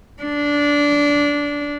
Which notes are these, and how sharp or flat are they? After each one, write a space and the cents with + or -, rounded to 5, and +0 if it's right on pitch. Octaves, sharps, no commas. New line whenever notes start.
D4 -15